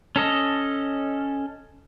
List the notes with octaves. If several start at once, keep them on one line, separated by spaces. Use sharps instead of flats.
C#4 A4 D#5